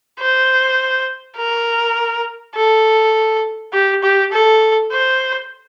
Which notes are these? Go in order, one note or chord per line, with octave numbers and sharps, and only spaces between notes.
C5
A#4
A4
G4
G4
A4
C5